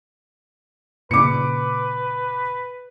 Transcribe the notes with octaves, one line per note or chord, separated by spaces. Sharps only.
A#2 C#3 B4 D6 C#7